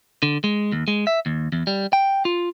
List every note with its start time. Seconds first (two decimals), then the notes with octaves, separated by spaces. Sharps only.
0.23 D3
0.44 G#3
0.72 D#2
0.88 G#3
1.07 E5
1.26 D#2
1.52 E2
1.67 G3
1.93 G5
2.25 F4